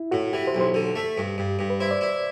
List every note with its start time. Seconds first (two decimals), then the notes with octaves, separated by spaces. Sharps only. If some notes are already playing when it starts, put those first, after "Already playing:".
Already playing: E4
0.11 A2 F#4
0.33 E3 G4
0.47 C5
0.55 B1
0.60 C5
0.74 D3
0.96 A3
1.18 G2
1.38 G2
1.59 G2
1.70 B4
1.80 E4 C5
1.91 D5
2.01 E4